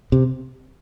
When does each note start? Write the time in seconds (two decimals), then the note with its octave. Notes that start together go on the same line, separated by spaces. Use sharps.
0.12 C3